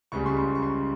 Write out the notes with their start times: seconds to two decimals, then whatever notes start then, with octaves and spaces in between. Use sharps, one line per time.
0.12 C#2 C#3 G3 C#6
0.26 C6
0.37 C#6
0.55 C#6
0.63 C6